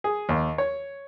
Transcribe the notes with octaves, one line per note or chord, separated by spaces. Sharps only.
G#4
D#2
C#5